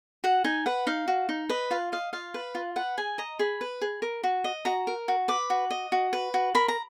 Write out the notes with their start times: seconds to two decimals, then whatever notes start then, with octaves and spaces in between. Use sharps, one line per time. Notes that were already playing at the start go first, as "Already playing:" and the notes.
0.24 F#4 F#5
0.44 D#4 G#5
0.66 B4 F#5
0.87 D#4 F5
1.08 F#4
1.29 D#4
1.49 B4 D#5
1.71 F4 F5
1.92 D#5 F5
2.13 F4 F5
2.34 B4
2.55 F4
2.76 B4 F#5
2.98 G#4 G#5
3.18 D#5 A#5
3.39 G#4 B5
3.61 B4
3.81 G#4
4.02 A#4
4.23 F#4
4.44 D#5
4.65 F#4 A#5
4.87 A#4
5.08 F#4
5.28 B4 D6
5.50 F#4
5.71 D#5
5.92 F#4
6.13 B4
6.34 F#4
6.55 A#4 B5
6.68 A#5